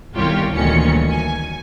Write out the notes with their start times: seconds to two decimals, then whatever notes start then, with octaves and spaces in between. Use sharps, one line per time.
0.13 G1 C2 D#3 F4 G4 C#5
0.53 D2 A#2 D#3 E3 C#4 C#7
1.09 G#5